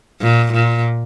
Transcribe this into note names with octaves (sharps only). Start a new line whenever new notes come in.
A#2
A#2